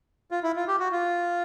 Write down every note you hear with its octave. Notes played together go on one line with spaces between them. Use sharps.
F4
E4
F4
G4
F#4
F4